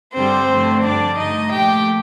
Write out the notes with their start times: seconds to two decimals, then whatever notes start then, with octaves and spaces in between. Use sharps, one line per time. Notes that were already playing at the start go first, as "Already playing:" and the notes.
0.15 G2 D3 G3 C4 C5
0.50 G2 D3 F3 A3
0.84 G2 D3 G3 D4 D5
1.19 G2 D3 A3 D#4 D#5
1.52 A#2 F3 A3 G4 G5